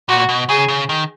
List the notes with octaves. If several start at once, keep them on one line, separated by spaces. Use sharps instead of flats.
A#2 F#4
B2
C#3 G#4
C#3
D#3